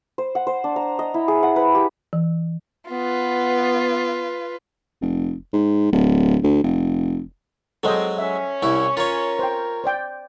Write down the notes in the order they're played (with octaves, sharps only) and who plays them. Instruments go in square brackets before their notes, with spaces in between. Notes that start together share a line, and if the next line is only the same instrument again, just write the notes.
[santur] C5
F#5
C5
D4
A#5
D#5
E4
G#4
F#5
B4
G4
[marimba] E3
[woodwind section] B3 [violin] F4 B4
[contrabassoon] F1
G#2
D1
D2
F1
[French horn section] F3 C4 [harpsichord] F#3 G#3 [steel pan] A4 C5 D#5
[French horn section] C#4 [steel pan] E5
[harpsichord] C2 E4 [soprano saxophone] C#6
[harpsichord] F4 C#5 [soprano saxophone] A#4
[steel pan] C5 G5
C5 D5 G5